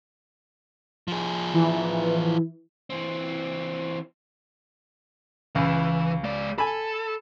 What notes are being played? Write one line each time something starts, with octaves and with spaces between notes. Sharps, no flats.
F3 G#4
E3
E3 C4
C#2 E3
G#3 D5
A4 G#5 B5